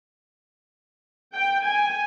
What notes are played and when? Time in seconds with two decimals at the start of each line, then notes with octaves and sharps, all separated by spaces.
1.34 G5
1.65 G#5